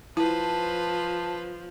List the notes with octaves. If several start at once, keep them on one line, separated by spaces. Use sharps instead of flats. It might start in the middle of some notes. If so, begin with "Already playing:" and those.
F3 E4 B4 C5 A5